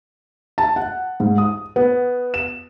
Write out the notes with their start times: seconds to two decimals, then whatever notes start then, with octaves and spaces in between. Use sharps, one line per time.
0.58 A5
0.76 F#5
1.20 G#2
1.38 D#6
1.76 B3
2.34 E7